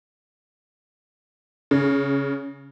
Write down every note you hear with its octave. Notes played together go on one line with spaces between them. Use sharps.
C#3